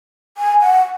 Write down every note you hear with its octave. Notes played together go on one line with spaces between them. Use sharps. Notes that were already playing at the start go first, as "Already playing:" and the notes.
G#5
F#5